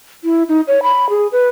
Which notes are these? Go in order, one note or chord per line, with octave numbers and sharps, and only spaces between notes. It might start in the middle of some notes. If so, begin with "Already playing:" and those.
E4
D#4
C#5
B5
G#4
B4